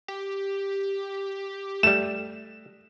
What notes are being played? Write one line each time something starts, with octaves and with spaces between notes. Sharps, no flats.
G4
G3 A3 E7